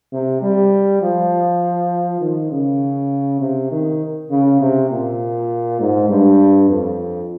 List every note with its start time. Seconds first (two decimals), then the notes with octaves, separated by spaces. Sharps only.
0.13 C3
0.42 G3
1.02 F3
2.21 D#3
2.51 C#3
3.40 C3
3.71 D#3
4.30 C#3
4.61 C3
4.91 A#2
5.80 G#2
6.09 G2
6.70 F2